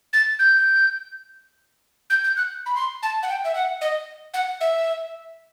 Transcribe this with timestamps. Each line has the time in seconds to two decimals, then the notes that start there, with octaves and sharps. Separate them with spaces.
0.13 A6
0.39 G6
2.10 G6
2.24 G6
2.37 F#6
2.66 B5
2.76 C6
3.03 A5
3.23 F#5
3.29 G5
3.44 E5
3.55 F#5
3.81 D#5
4.34 F#5
4.61 E5